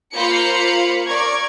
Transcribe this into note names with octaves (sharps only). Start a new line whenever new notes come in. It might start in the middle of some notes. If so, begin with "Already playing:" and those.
A#3 F4 C5 F5 B5 C#7
A#4 D5 C#6 G#6